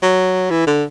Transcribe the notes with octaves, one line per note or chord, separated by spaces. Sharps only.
F#3
E3
D3